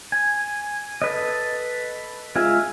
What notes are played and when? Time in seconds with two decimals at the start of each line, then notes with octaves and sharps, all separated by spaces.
0.12 G#5
1.02 A4 B4 D#5
2.36 G#3 F4 G#4 E5